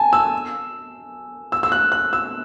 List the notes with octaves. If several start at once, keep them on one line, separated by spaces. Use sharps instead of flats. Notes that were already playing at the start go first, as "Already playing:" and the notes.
Already playing: G#5 A5
E6
E6
E6
F#6
F#6
E6